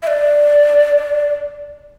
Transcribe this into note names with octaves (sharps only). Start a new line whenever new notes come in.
E5
D5